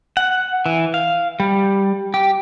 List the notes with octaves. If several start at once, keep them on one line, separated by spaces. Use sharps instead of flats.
F#5
E3
F5
G3
G4